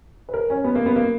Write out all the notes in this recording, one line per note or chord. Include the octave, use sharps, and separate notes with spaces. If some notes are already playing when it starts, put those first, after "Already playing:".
B4
A#4
C#4
B3
A#3
B3
A#3